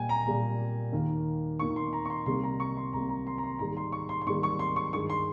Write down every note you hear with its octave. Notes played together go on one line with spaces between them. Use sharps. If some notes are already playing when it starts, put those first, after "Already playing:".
Already playing: A#2 G3 A#3 G5 G#5
A#5
A#2 G3 A#3
D#2 D#3 A#3
D#2 D#3 A#3 C#6
C6
A#5
C#6
C6
C2 C3 G3 A#3 C6
A#5
C#6
C6
C2 C3 G3 A#3 A#5
A#5
C6
A#5
C6
G#2 D#3 G3 A#3 A#5
C6
C#6
C6
C6
G#2 D#3 G3 A#3 C#6
C#6
C6
C#6
G2 D#3 G#3 C#6
C6